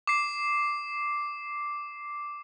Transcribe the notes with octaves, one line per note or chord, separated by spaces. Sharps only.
D6 C7